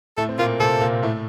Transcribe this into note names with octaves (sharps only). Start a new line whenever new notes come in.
A2 A3 A4
C4
A#2 A#3 F4
C3 C4 A4
A#2 A#3
A2 A3